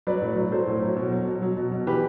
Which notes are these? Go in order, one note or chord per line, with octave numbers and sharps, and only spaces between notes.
F#3 B4 D5
A2
F#3
F#3 A4 C5
A2
F#3
B2
F#3
B2
F#3
B2
B2
E3 G4 B4